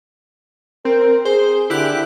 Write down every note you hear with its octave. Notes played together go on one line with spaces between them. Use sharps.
C4 A#4
G#4 C5
D3 E4 G4 F#6